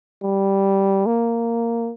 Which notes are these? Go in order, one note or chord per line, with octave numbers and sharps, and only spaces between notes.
G3
A#3